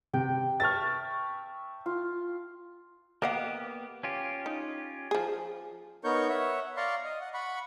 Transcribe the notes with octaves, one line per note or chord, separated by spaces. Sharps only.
C3 G5
E5 A5 C#6 F6 A6
F4
A#3 B3 G4 D#5 F5 F#5
C#4 F4 G4
D#4
F3 G#4
B3 D#4 A#4 C#5 C#6 G6
C#5 E5 F#5
D5 F5 A#5 C6 C#6
D#5
F#5
F#5 B5 C#6